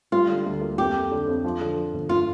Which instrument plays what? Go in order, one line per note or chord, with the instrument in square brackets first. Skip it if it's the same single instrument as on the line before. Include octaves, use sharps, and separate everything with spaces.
[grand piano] G3 [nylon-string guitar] F4
[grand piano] D3
D2
A#3
[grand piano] F2 [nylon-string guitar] G4
[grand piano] A3
D3
F2
F3
D3
F3
G1
[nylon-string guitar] F4